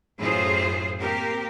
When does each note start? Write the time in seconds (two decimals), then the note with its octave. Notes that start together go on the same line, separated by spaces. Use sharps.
0.18 F#2 A2 F4 G#4 C5
1.02 A#3 C4 G4 A#4